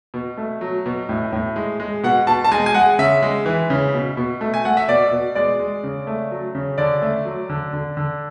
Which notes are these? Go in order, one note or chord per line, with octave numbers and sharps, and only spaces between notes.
B2
A3
F#3
B2
A2
A2
G#3
G#3
B2 F#5
B2 A5
A5
G#3 G#5
G#5
G#3 F#5
C#3 E5
G#3
E3
C#3
B2
B2
A3
G#5
A3 F#5
E5
B2 D5
B2
G#3 D5
G#3
C#3
A3
F#3
C#3
D3 D5
A3
F#3
D3
D3
D3